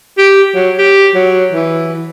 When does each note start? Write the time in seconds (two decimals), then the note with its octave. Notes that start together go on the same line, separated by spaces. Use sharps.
0.18 G4
0.55 F#3
0.78 G4
1.15 F#3
1.53 E3